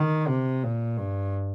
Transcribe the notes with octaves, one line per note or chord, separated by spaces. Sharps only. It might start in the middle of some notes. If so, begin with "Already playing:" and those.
Already playing: D#3
C3
A#2
G2